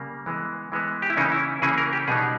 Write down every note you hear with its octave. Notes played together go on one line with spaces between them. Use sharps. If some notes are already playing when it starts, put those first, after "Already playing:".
Already playing: C#3 G3 A#3
E3 G#3 B3
E3 G#3 B3
G4
E4
C#3 E3 A#3 C#4 D#4
E4
C#3 E3 A#3 C#4 G#4
A#4
G4
B2 G3 B3 D#4 G#4